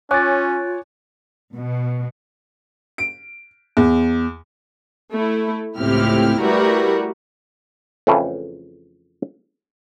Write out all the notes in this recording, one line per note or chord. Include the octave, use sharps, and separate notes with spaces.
C#4 F4 C#5 G#5 D6 F#6 A6
B2
D7
E2
A3 E4
C#2 A2 C3 E4 G4 F6
G3 A3 E4 F#4 A#4 B4
F2 C#3 E3 A3 C#4